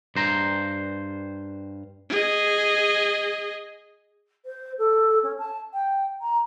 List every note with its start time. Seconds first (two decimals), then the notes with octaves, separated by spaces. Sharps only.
0.16 G2 C5 A#5
2.10 G#4 D#5
4.46 C5
4.79 A4
5.23 C#4
5.38 A5
5.74 G5
6.21 A#5